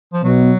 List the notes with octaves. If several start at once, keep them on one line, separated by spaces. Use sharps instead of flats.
F3
B2 F#3